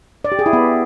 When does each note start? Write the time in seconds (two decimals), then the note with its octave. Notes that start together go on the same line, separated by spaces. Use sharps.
0.25 D5
0.32 G4
0.39 G#4
0.46 E4
0.53 B3